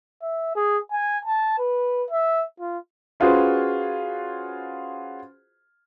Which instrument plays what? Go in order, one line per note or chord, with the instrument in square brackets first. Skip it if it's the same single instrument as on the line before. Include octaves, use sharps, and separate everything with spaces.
[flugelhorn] E5
G#4
G#5
A5
B4
E5
F4
[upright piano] C#4 F4 F#4 G#4 B4 C5